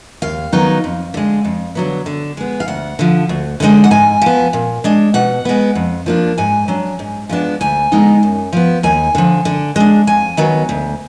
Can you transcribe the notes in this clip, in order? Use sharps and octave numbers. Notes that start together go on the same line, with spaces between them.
D#2 F5
D#3 F#3 B3 D#4
F2
D3 G#3
F2
D3 F#3 B3
D3
G#3 B3
F5
D2 F#5
D3 F3
D2
D3 F3 G#3 D#4
F#5
G#2 G#5
F3 B3
A#2
G#3 D4
B2 F#5
G#3 B3
F2
F3 A#3 D4
G#2 G#5
F#3 D4
G#2
F3 G#3 B3 D4
D2 G#5
D3 G#3 B3 D#4
F#2
F3 B3
D#2 G#5
D3 F3
D3
G#3 D4
F2 G#5
D#3 F#3 B3
D2